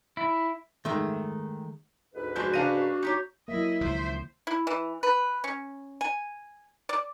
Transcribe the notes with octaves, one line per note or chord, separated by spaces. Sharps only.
E4
D#3 G#3 A3
D2 G#2 B4
F3 G#3 D4 F#4 G6
C#3 D4 A4 F5 A#5 D#7
D#4 G4 C#5
F#3 A#3 E4 D#5 E5
C#2 D#3 F3 C5
E4
E3
B4
C#4
G#5
D5